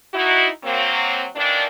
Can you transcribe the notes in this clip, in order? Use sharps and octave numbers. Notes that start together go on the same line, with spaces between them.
D#4 E4 F#4
F#3 A#3 C4
D#3 E3 A#3 D4